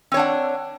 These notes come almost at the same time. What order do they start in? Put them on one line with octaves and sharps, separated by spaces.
C4 C#5 D4 F#5